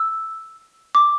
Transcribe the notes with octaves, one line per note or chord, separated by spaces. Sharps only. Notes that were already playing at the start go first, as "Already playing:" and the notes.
Already playing: E6
D6